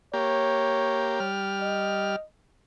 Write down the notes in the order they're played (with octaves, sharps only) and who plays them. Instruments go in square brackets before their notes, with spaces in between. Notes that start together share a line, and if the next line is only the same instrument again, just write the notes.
[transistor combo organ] A#3 G4 [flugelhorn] C#5
[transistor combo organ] G3 F6
[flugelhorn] D#5